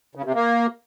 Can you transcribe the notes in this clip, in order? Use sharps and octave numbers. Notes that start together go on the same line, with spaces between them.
C#3
C3
A#3